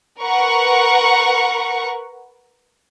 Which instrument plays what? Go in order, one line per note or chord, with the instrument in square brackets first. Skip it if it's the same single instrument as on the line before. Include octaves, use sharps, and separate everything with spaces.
[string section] A#4 B4 F#5 A#5 C#6